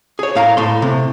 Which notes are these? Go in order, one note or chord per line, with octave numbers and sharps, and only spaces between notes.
G#4 C#5
A2 F5 A#5
A2 C6
C3